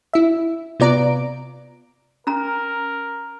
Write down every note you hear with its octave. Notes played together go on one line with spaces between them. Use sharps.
E4 E5
C3 B3 F4 D5 A#5 D7
C#4 A#4 A#5